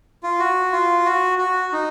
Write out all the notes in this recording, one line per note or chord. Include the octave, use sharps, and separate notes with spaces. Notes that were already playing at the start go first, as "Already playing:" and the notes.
F4
F#4
F4
F#4
F#4
D#4